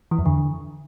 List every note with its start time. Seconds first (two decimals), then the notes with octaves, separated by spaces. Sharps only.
0.11 E3
0.19 F2
0.26 D3